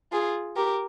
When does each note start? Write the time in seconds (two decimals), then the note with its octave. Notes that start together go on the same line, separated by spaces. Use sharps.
0.12 F4 G#4
0.56 G4 A#4